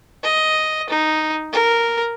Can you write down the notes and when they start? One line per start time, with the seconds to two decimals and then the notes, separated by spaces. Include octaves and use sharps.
0.24 D#5
0.90 D#4
1.53 A#4